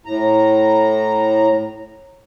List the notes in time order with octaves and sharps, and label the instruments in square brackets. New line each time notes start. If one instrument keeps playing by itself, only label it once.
[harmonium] A2 A#5